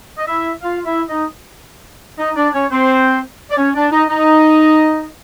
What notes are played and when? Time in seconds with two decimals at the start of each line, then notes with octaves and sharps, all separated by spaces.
0.18 D#5
0.28 E4 E5
0.63 F4 F5
0.86 E4 E5
1.09 D#4 D#5
2.19 D#4 D#5
2.36 D4 D5
2.54 C#4 C#5
2.71 C4 C5
3.51 D5
3.58 C#4 C#5
3.75 D4 D5
3.92 D#4 D#5
4.09 D#4 D#5